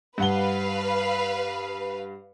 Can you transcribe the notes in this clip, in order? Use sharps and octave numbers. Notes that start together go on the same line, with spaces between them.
G2 B4 F5 F#5 G7